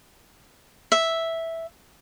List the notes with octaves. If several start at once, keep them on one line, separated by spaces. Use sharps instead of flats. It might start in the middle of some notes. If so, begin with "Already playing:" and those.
E5